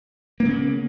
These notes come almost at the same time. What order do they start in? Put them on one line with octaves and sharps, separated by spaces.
A#3 C#3 B3